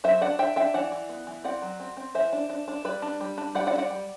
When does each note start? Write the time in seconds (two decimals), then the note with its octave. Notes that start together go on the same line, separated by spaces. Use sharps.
0.04 F#3 C5 E5
0.21 D4 D5 F#5
0.39 D4 E5 G5
0.56 D4 E5 G5
0.74 E3 D5 F#5
0.92 E3
1.09 B3
1.27 E3
1.44 C4 D5 F#5
1.62 F#3
1.80 C4
1.97 C4
2.15 E3 C5 E5
2.33 D4
2.49 D4
2.68 D4
2.85 G3 B4 D5
3.02 D4
3.20 G3
3.38 D4
3.55 G3 D5 F#5
3.67 D5 F#5
3.73 D4
3.78 D5 F#5
3.90 G3